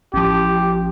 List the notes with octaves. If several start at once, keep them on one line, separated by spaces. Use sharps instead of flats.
A1 F3 G4